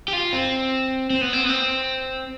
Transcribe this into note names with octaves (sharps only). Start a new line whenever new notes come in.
G4
F4
C4
C4
B3
C4
B3
C4